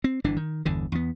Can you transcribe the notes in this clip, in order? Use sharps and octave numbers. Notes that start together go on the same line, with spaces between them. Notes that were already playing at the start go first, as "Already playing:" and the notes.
C4
G1 E3 D4
D#3
G1 E2 D3
E2 B3